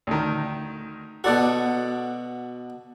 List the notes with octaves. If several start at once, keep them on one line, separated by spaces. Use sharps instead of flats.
D2 D#3
B2 F#4 A4 D5 F#5